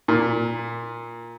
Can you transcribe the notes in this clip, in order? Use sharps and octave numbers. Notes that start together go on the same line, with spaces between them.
A#2